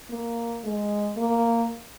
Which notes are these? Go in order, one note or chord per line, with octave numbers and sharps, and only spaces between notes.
A#3
G#3
A#3